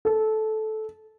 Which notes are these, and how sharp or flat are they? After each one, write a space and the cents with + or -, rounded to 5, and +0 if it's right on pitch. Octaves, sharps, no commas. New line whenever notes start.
A4 -15